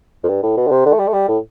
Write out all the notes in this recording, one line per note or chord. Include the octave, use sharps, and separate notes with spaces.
F2
G2
A2
B2
D3
C3
D3
A3
G3
A3
G3
A2